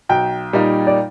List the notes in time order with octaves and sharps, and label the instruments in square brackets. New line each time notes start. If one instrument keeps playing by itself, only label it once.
[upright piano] B1 [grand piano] G5
[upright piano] A#2 G3 A#3 D#4
[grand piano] D5